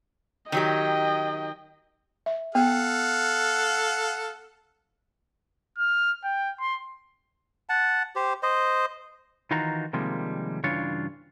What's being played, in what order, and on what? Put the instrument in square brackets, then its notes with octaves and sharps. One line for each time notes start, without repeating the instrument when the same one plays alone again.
[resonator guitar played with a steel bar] D#3 F#3 G4 [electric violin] D#5 G5
[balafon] E5
[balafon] B3 [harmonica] A4 F5 F#5
[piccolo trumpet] F6
G5
C6
[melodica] F#5 A5
G4 C5
C5 D#5
[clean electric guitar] D#3 E3 D#4 F4 F#4 A#5
C3 D#3 F3 G3 G#3 A#3
G2 C#3 E3 D4 F4 C#5